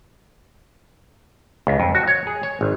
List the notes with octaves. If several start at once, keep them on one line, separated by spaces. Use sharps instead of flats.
C#2
F2
F#4
C#5
G#4
C#5
G#1